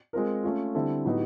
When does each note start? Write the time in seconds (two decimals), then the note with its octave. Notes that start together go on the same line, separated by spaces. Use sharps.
0.13 G#3 C4 F4 A#4
0.44 A3 C#4 F4
0.75 D3 G3 C4 E4 A4
1.05 A2 F#3 B3 D#4 G4